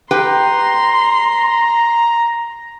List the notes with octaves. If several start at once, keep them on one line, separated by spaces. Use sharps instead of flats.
G4 B4 G5 A#5 C6